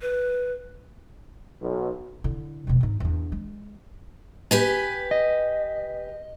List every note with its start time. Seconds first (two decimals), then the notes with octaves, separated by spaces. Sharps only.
0.01 B4
1.61 B1
2.24 D3 E4
2.67 E1 B2
2.80 G#2 D#4
3.00 E2 D4
3.32 G#3
4.51 G4 B4 G#5
5.11 D#5